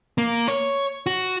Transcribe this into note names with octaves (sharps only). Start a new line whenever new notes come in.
A#3
C#5
F#4